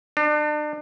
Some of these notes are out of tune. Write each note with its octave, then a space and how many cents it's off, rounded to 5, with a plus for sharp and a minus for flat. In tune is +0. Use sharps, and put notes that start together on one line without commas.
D4 +35